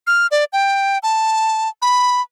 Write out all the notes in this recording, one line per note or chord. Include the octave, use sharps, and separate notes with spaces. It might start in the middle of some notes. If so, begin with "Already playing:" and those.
F6
D5
G5
A5
B5